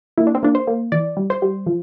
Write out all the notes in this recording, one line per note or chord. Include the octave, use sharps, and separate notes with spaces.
A#3 E4
D4
C4
A#3 D4
C5
A#3
E3 D5
G3
C5
G3
F3